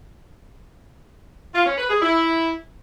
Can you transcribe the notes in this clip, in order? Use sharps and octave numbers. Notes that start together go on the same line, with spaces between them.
F4
C#4
B4
G#4
E4